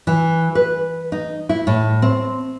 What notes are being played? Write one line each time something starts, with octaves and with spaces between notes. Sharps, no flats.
E3
B4
D#4
E4
A2
C4